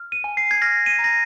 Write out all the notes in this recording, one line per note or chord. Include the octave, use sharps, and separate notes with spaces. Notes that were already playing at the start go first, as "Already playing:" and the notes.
Already playing: F6
D#7
G#5
C7
G#6
F6 A#6
D#7
A#5
A#6